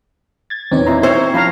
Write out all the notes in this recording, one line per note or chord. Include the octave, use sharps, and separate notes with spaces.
G#6 A6
E2 A#2 C4 D#4 C#5
D#4 E4 A#5 C6
C4 C5 C#5 E5 G5 E6
F3 C#4 F5 A#5 B5 F6